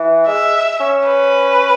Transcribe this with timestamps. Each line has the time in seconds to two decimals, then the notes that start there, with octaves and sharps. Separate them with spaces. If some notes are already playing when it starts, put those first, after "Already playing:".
Already playing: E3
0.27 G#3 E5
0.80 C#4
1.07 B4